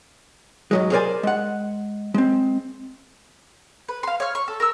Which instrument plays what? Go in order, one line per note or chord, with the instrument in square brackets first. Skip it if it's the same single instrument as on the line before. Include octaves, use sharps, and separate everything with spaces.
[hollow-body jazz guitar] G#2 F#3 G#3
G#4 A#4 C5 D5 G#5
G#3 F#5
G#3 C4
[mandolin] B4
F5 C6
C#5 F6
C#6
A4
A#4 E6